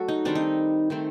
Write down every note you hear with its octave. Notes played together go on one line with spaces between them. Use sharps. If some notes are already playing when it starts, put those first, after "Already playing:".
Already playing: F#3 A3 F#4 A4
D#4
D#3 G3 C4 D4
D#4
D#3 A3 C4